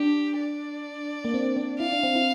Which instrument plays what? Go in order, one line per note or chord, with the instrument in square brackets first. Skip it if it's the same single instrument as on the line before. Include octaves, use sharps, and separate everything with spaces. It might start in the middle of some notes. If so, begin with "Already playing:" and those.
Already playing: [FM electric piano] D4 [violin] G4
[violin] D5
[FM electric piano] A#3
C4
C4
[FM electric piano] E4 [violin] F5
[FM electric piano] D4
C4
E4